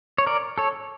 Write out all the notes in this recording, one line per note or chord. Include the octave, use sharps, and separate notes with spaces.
C#5
A#4 D5
A4 C#5